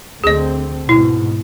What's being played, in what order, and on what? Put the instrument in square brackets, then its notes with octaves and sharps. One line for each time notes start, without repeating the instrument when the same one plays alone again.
[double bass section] D2 D3 C4 [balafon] G#4 D#5
[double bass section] G#2 B2 [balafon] E4